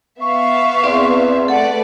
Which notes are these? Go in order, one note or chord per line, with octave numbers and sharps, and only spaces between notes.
B3 E5 F5 C#6
E2 C4 D5 C6
A3 A4 B4 D5 F#5